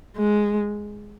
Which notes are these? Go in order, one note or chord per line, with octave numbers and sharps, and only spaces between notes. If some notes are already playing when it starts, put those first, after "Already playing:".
G#3